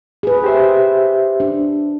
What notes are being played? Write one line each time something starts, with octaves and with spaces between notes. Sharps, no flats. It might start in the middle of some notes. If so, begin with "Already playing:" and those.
G#4 B4
G4 C5 E5
D4